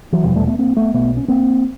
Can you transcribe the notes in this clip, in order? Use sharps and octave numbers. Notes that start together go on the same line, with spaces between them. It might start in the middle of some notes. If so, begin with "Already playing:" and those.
E3 F#3
F1 E2 B2 F3 G3
G3 A3
A3 B3
A#3 C4
A3 B3
B1 B2 A3 B3
C#4
A#3 C4